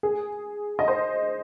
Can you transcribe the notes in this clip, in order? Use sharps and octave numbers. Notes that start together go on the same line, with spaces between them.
G#4
D#5
C5